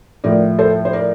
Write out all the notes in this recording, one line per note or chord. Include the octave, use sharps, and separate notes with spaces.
A2 F3 A#4 D5
A4 C5
C5
A#4 D5